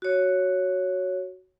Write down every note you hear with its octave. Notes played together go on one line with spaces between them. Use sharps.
F#4 C#5